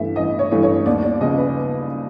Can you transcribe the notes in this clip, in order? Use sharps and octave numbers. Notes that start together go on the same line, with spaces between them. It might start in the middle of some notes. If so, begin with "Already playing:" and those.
Already playing: A1 G2 E3 A3 E5
A1 D#5
C#5
G2 E3 A3
C#5
D#2 D5
D5
C#3 F3 G#3 B3 D#5
B4